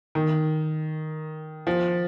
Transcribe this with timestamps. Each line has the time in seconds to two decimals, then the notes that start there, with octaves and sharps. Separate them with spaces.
0.15 D#3
1.67 F3